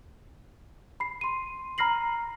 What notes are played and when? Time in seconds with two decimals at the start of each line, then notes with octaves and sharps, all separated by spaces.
1.00 B5 C7
1.21 C6 D#7
1.78 A#5 B5 F6 A#6 C7 F#7